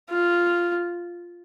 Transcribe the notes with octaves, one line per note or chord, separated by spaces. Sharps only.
F4